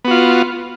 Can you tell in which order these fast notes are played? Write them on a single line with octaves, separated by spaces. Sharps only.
B3 F#4 F4